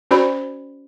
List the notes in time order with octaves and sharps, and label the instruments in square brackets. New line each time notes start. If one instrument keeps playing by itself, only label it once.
[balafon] C#4 F#4 C5 D5 B5